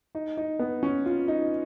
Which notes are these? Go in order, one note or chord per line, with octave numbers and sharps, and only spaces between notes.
D#4
D#4
B3
C#4
F4
D#4